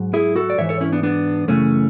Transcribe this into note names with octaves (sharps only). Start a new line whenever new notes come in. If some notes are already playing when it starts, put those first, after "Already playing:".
Already playing: G#2 F#3
E4 G#4
F#4 A4
D5
G#2 E3 C#5 E5
A4 C#5
C#4 E4
B3 D4
B3 D4
F#2 C#3 E3 A3 C#4